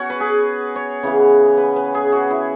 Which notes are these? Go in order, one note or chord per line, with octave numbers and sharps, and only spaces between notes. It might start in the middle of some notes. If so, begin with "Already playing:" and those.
Already playing: B3 C#4 F#4 C#5
B4
G#4
C#5
C#3 E3 B3
B4
B4
G#4
F#4
E4